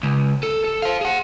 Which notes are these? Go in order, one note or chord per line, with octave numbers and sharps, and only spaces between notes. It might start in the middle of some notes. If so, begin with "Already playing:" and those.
C#2
A4
A4
C5 F5
G#4 F#5